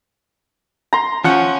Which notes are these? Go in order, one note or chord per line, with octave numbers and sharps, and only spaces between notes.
A#5 C6
F3 C#4 F#5